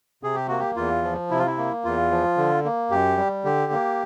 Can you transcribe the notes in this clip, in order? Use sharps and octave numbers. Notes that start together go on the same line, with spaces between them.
C3 G#4
G4
A#3 F#4
G4
E2 F4
F3
C3 E4
F4
E4
A#3
E2 F4
F3
D3
A#3
F#2 G4
G3
D3 G4
A#3